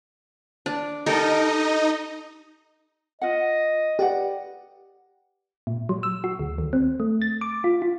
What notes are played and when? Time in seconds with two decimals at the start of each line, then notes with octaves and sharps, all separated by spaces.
0.66 D4
1.06 D#4 G4 A4 A#4 D#5
3.22 F4 D#5 F#5
3.99 G4 B4 D5 F#5
5.67 A#2
5.89 F#3
6.03 E6
6.24 F#4
6.39 D2
6.58 D#2
6.73 C4
7.00 A3
7.22 A6
7.41 D6
7.64 F4
7.82 F4